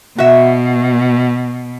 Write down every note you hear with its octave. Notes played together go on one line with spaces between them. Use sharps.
B2 F#4 E5